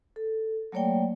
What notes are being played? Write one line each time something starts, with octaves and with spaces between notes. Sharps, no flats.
A4
F#3 A3 A#3 C#5 D5 G5